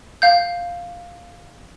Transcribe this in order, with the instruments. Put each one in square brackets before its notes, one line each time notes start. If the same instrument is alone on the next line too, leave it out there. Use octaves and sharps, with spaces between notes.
[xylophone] F5 G6